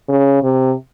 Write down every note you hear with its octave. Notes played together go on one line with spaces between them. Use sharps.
C#3
C3